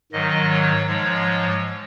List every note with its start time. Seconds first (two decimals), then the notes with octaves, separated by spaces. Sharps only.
0.12 G#2 D#3 F#3 D#5
0.50 C#5
0.87 G#2 F3 G#3 C#5